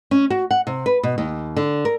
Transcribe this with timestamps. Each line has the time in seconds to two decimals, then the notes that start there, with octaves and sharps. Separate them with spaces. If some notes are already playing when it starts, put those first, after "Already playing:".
0.11 C#4
0.30 F#4
0.51 F#5
0.67 C3
0.86 B4
1.03 B2
1.18 D#2
1.56 D3
1.85 A#4